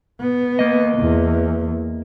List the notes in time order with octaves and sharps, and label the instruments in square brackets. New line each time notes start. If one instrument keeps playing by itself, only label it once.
[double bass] B3
[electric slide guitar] A#3 D#5
[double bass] E2